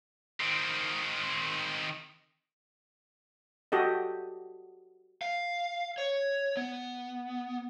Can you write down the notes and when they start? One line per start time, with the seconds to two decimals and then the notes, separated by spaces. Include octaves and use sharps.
0.41 D#3 C4
3.72 F#4 G4 A4 D#5
5.21 F5
5.98 C#5
6.57 B3